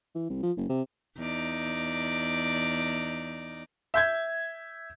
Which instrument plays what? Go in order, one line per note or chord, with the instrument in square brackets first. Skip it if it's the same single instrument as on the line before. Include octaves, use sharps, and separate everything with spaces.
[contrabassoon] E3
C2
F3
F#1
C3
[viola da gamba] E2 D#4 D5
[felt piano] E5 G6 G#6